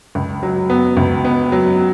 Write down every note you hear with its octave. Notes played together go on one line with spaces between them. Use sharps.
C#2
F#3
B3
C#2
B3
F#3